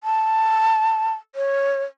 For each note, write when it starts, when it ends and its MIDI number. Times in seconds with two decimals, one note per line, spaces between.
0.04 1.13 81
1.35 1.84 73